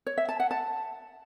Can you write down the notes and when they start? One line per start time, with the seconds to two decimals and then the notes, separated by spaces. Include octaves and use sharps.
0.06 C#5
0.18 E5
0.29 A5
0.40 F#5
0.51 A5